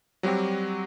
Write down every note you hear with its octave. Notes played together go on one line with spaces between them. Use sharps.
F#3 G3 C4 F#4 G4